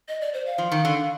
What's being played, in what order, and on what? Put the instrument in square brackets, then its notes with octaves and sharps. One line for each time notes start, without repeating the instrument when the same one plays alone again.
[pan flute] D#5
D5
C5
F5
[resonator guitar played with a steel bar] F3
D#3
D3